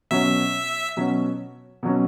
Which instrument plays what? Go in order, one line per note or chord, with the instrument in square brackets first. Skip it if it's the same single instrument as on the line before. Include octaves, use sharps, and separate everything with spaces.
[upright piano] B2 F#3 C#4 [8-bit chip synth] E5
[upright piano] B2 F#3 C#4
B2 F#3 C#4